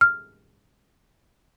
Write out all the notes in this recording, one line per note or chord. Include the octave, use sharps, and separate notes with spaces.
F6